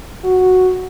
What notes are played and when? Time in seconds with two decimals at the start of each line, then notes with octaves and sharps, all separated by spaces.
0.24 F#4